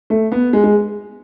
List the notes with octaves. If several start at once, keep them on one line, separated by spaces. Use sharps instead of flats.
A3
B3
G#3
G#3